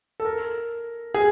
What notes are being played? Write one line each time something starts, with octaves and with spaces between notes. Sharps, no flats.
A4
A#4
G#4